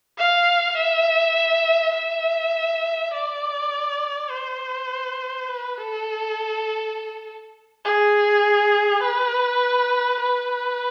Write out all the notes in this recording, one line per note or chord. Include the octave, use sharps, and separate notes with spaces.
F5
E5
E5
D5
C5
B4
A4
G#4
B4
B4